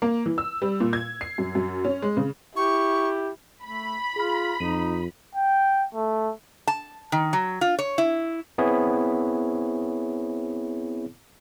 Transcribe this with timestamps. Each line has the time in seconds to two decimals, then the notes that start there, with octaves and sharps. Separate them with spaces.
0.02 A#3
0.26 E3
0.38 E6
0.62 G3
0.80 A#2
0.93 G#6
1.21 C7
1.38 F#2
1.55 F#2
1.85 C#4
2.02 G#3
2.17 C#3
2.56 E4 G4 C#6
3.63 A3 B5
4.16 F4 G#4 F6
4.60 F2 D#4 F4 D#7
5.35 G5
5.95 A3
6.67 A5
7.12 D#3
7.33 F#3
7.61 F4
7.79 C#5
7.98 E4
8.58 B3 C4 E4 G#4 C#5